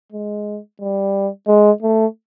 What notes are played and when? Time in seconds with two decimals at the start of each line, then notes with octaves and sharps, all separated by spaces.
0.12 G#3
0.81 G3
1.47 G#3
1.82 A3